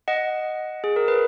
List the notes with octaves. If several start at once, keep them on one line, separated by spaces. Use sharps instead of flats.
D#5 F#5
G#4
A#4
B4